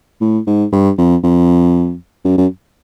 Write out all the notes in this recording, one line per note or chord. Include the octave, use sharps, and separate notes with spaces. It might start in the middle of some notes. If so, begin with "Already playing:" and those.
A2
G#2
G2
F2
F2
F#2
F#2